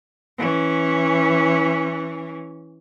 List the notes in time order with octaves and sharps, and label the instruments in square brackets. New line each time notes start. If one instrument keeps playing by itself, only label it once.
[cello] E3 C#4